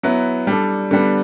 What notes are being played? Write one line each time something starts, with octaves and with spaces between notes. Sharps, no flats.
F#3 B3 E4
G3 D4 A4
D3 G3 B3